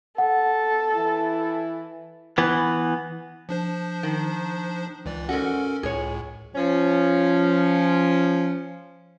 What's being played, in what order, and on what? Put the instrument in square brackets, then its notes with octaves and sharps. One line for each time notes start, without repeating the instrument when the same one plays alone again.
[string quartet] A4 [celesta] F#5
[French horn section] E3 E4
[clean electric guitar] E3 B3
[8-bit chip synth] F3 D4 C5
[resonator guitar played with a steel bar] D#3
[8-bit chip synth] C#2 E3 D5
[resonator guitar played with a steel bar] G#2 F#4 [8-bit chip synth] C#4 A4 A#4
[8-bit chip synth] C#2 A2 [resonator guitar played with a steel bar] G#4 C#5
[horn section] F3 C#4